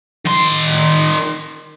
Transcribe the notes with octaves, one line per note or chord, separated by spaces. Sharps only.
D#3 C6